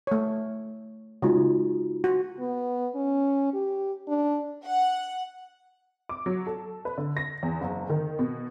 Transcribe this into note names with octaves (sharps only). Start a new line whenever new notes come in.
A3 C#5
C#3 G#3 D#4 F4 F#4
F#4
B3
C#4
G4
D4
F#5
D6
F#3
A4
B4
D3
A#6
E2
F#1
D#3
B2